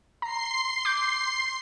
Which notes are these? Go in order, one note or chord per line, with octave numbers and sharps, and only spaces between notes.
A#5 C6 C7
D6 G6